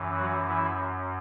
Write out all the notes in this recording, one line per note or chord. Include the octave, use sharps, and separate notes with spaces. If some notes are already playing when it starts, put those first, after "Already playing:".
Already playing: F#2 E3
F#3 F#4
E3 E4